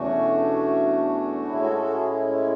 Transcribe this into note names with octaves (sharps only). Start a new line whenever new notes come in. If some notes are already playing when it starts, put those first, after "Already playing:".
Already playing: E2 B2 A3 C#4 D4 F#4
A2 G#3 C#4 E4 G#4
G#4
F#4 A4
F#4 A4
E4 G#4
E4
E4